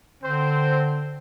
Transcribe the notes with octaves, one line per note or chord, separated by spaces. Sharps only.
D3 C4 C5